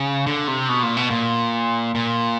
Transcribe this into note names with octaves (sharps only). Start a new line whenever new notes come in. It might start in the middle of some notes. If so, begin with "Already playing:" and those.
Already playing: C#3
D3
C3
B2
A#2
B2
A#2
A#2